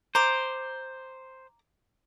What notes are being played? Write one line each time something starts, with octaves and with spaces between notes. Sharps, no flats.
C5 A#5 D6